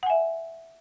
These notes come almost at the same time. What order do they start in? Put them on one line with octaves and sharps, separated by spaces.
F#5 G#5 E5